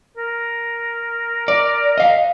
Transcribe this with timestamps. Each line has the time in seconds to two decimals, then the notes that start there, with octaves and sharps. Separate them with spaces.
0.17 A#4
1.48 D5
1.98 D#5 F5